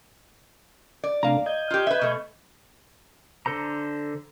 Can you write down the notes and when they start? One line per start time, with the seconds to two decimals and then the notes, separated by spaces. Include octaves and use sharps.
1.04 D5
1.23 C3 A3 D4 F5 A#5
1.46 D#5 G6 G#6
1.71 F4 G4
1.87 B4 E5
2.02 B2 A3
3.46 D3 A4 C5 A#5